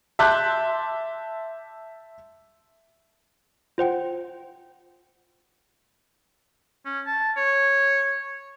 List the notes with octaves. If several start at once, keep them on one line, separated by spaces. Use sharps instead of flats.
E5 A5 C6 D6 F#6 G6
F4 C5 F#5 G5
C#4
A5
C#5